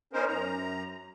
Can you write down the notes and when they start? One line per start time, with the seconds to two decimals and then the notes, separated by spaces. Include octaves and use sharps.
0.13 B3 C#4 D#4 A#4 C5
0.28 F#2 A#5